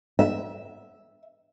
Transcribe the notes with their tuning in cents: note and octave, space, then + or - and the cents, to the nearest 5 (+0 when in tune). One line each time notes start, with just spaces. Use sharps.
E5 -5